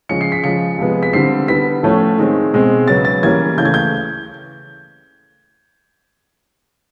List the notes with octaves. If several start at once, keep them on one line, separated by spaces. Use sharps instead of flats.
C#3 F3 G#3 C#4 C#7
C7
B6
C#3 F3 G#3 C#7
C3 F3 G#3 B3
B6
D3 G3 C4 C7
D3 G3 B3 B6
A2 F3 A3 C#4
D#3 G#3 C4
B2 G#3 C4
C#3 F#3 B3 A6
A6
E3 G3 A#3 C#4 G#6
C#3 E3 A3 G6
G#6
G6